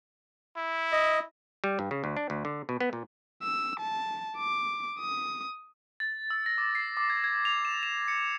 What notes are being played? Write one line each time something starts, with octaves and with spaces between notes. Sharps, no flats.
E4
D#5
G3
G2
C#3
D2
D4
D2
D3
B2
B3
A#2
E6
A5
D6
D#6
A6
E6
A#6
D6
C7
D6
G#6
G#6
F7
E7
E7
C#7